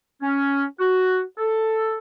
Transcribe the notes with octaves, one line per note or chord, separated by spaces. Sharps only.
C#4
F#4
A4